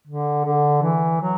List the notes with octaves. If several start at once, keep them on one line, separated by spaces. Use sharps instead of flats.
D3
D3
E3
F#3